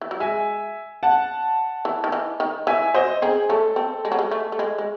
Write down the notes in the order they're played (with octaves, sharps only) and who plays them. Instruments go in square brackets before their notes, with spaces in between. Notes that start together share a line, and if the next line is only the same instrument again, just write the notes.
[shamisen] E3
F#3
[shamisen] G#3 [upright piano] E5 G#5
[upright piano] F#5 A5
[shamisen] E3
D#3
E3
D#3
[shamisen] E3 [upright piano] E5 G#5
[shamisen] F#3 [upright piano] C5 D#5
[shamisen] C4 D#4 [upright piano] G#4
[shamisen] A3 C#4 [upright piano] A4
[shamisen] C4
G#3
F#3
G#3
A3
A3
G#3
G#3